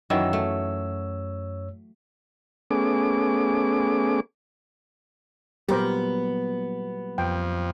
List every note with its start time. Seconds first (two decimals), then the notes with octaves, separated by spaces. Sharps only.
0.10 F#2 D#3 E3 F#3 C#5 E6
0.33 A3
2.71 A3 B3 C#4 G#4 D6
5.69 A#2 F#3 G3 B3 G4 A#4 C5
7.18 F2 G5